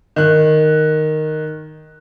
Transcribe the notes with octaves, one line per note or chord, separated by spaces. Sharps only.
D#3 F#6